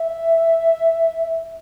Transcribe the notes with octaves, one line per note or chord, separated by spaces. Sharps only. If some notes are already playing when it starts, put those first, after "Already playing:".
Already playing: E5